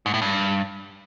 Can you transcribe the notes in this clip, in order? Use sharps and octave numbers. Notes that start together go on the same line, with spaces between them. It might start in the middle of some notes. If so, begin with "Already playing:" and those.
G#2
A2
G2